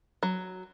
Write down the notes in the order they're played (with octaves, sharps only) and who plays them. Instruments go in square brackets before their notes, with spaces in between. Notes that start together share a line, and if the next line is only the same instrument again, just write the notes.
[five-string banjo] F#3